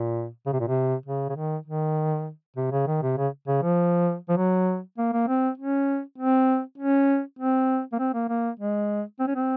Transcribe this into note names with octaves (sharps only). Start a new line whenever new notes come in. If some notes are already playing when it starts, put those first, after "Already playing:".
Already playing: A#2
C#3
C3
A#2
C3
C#3
C#3
D#3
D#3
C3
C#3
D#3
C3
C#3
C#3
F3
F3
F#3
A#3
A#3
C4
C#4
C4
C#4
C4
A#3
C4
A#3
A#3
G#3
C4
C#4
C4